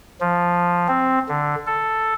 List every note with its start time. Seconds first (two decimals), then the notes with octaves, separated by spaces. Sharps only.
0.21 F3
0.88 C4
1.29 D3
1.67 A4